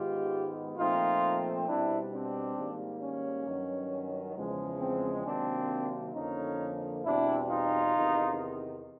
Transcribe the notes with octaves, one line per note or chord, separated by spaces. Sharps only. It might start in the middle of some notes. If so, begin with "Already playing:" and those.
Already playing: G#2 D#3 G#3 B3 F4 G4
A#2 F3 A3 C4 D#4 F4
B2 G3 C4 D4 E4
C4 D4
G#2 D#3 G3 A#3
C#4
G2 D#3 F#3
E2 C#3 F3 G#3
C4
C3 D#3 F#3 A#3 C4 D4
F2 D3 F3 A#3 C#4 D#4
E2 B2 G3 C4 D4 E4
D#4 F4
E2 C3 D#3